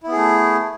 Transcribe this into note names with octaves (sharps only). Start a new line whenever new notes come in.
A3 B3 E4 G#4